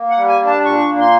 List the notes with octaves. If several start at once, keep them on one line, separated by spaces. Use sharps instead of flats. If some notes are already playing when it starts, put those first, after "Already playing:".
Already playing: A#3
F#5
G3
G#5
D4
A5
A#2 C#6
A#3
C6